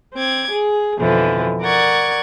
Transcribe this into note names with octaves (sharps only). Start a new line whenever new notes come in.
C4 D6 G#6
G#4
F2 B2 D3 E3 F3
A#4 D5 F#5 C#6 G#6